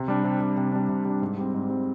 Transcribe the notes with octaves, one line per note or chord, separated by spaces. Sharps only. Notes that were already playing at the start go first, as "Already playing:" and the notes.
Already playing: C3
G3 D4
C3
G3 D4
C3
G3 D4
C3
G3 D4
G#2
G3 C4
G#2
G3 C4